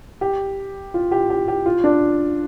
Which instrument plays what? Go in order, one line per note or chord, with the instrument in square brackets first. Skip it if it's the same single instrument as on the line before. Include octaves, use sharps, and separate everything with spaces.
[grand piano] G4
F4
G4
G4
G4
F4
D4